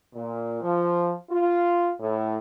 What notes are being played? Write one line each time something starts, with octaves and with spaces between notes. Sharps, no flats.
A#2
F3
F4
A2